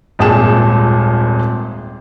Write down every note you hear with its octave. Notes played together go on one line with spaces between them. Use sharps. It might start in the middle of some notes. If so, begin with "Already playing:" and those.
D#1 G#1 A#2 G#4 A5 E7